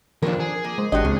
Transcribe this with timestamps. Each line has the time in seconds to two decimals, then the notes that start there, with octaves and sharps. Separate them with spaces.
0.22 D#2 F3 D4 A#4
0.40 G#4
0.65 A#3
0.78 G#3 C5
0.92 G#1 D4 F#4 G4 C#5 D#5
1.05 C#2 A#2 C4